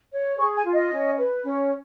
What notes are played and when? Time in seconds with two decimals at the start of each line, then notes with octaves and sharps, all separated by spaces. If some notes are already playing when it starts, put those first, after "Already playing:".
0.12 C#5
0.39 G#4 C#6
0.57 G#5
0.65 F4
0.73 D#5
0.92 C#4
1.17 B4
1.44 C#4